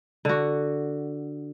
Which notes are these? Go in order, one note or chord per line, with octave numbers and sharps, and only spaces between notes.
D3 F#4